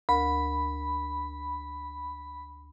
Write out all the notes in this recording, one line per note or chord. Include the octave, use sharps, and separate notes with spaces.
D2 A#4 B5